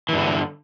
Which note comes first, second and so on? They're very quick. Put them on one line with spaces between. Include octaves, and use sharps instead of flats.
E3 G2 D3